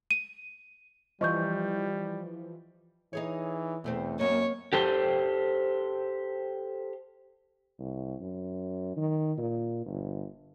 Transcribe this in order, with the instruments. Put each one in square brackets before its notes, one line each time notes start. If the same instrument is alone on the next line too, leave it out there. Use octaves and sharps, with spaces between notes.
[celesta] D#7
[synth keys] E3 F3 [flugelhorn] G3 [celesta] D#5 C#6 G6
[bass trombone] E3 [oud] D#4 G#4 C#5
[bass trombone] E2 [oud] B2 A3 C4
[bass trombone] F#2 [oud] A#3 D#5 [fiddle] C#5
[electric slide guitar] G4 A4 C5 G5
[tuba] C2
F#2
D#3
A#2
G1